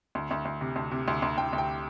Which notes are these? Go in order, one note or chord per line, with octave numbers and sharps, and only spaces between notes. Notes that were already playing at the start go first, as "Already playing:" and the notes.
D2
D2
D2
C3
D2
C3
D2
D2
D2 G5
D2
G5